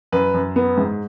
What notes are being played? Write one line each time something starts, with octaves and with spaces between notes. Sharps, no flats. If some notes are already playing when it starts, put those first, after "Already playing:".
F#2 B4
F#2
B3
G#2